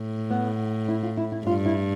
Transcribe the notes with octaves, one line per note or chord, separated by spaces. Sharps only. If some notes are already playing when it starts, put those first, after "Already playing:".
Already playing: A2
B3
E4
F4
E4
E4
G2 F4
E4